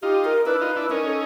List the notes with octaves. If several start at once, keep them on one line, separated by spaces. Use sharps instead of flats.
D#4 F4 G4
A#4
D4 E4 B4
D#4 F4
D4 E4
C#4 D#4 A#4
A4